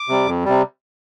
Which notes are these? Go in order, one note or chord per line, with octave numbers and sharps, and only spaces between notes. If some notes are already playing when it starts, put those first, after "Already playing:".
Already playing: D6
C3 G3
F2
C3 G3